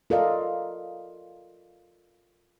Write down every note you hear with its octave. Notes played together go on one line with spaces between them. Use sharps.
F4 A4 A#4 D5 D#5 F5